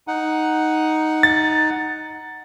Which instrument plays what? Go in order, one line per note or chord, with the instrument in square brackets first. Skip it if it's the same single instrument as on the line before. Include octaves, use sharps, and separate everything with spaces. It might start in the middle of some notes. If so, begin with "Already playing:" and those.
[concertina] D#4 F#5
[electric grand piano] A6